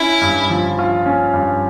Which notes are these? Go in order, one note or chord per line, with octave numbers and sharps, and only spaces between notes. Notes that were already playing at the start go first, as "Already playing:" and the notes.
Already playing: C#4 E4
G2
F3
F4
C#4
G2